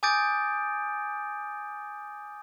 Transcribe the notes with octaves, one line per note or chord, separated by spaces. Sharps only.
G#5 D6 D#6 G6 A6 D7